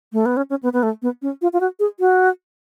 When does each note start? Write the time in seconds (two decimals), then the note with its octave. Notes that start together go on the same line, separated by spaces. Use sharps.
0.13 A3
0.26 B3
0.37 C#4
0.50 C#4
0.63 B3
0.73 B3
0.83 A3
1.02 B3
1.22 C#4
1.42 F4
1.53 F4
1.60 F#4
1.80 G#4
2.00 F#4